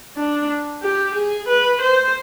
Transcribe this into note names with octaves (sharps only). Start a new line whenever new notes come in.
D4
G4
G#4
B4
C5